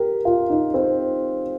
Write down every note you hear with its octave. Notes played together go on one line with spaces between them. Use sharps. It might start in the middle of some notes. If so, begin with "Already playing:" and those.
Already playing: G4 A#4
F4
D#4
C4